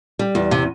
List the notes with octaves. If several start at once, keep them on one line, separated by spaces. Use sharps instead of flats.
G3
E2
C3